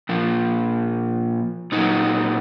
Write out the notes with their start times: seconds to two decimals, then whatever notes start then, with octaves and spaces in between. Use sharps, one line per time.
0.09 A#2 F3
1.72 A#2 F#3 D#4